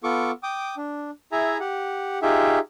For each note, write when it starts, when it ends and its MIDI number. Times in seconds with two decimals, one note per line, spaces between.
0.04 0.31 59
0.04 0.31 65
0.04 0.31 69
0.04 0.31 85
0.04 0.31 86
0.43 0.75 79
0.43 0.75 86
0.43 0.75 87
0.77 1.11 62
1.32 1.58 64
1.32 1.58 68
1.32 1.58 76
1.32 1.58 80
1.32 1.58 82
1.60 2.19 67
1.60 2.19 78
2.22 2.59 63
2.22 2.59 65
2.22 2.59 67
2.22 2.59 68
2.22 2.59 76